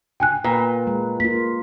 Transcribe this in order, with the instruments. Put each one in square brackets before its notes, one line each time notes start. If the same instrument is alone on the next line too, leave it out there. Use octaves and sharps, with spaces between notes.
[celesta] G5 G#5 F#6
[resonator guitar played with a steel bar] A#2 [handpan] B4
[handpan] G#3
[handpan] A#3 F4 [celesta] B6